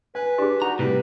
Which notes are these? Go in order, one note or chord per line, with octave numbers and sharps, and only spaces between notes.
B4 G#5
D4 G4 G#4
D#4 F#4 A#5
A2 C3 G3 B4